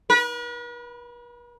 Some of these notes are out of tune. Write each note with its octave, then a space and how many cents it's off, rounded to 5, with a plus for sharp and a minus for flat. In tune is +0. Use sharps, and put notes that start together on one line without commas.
B4 -45